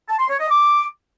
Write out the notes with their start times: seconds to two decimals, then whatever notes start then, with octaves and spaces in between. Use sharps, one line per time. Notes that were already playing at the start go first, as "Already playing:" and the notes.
0.08 A5
0.18 C6
0.28 C#5
0.39 D#5
0.49 D6